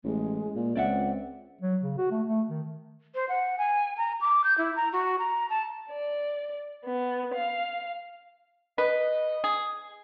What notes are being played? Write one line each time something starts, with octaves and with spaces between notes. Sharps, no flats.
A1 G#3
A#2
C#2 C4 D5 E5 F#5
F#3
C#3
F#4
A3
A3
D#3
C5
F#5
G#5
A#5
D6
G6
E4
A#5
F#4
A#5
A5
D5
B3
F5
B4 D#5
G#4